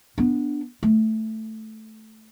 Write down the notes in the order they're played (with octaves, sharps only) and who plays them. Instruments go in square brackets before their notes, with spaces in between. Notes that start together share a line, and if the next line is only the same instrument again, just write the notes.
[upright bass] B3 D4
A3